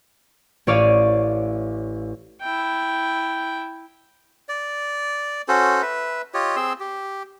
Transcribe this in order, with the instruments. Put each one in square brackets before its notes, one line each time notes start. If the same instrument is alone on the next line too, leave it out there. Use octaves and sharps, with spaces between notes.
[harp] A1 E4 C#5 D5 F5 D#7
[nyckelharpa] E4 G5
[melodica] D5
C#4 F#4 A4 C5
B4 E5
F4 G4 C#5 D#5
C4 G#4 C6 E6
G4